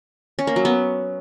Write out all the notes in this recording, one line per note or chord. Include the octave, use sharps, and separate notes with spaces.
C#4
A#3
F#3
B3